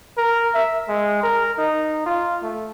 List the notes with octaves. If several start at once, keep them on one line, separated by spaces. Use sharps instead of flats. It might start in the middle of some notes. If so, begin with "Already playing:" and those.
A#4
E5
G#3
A#4
D#4
F4
A3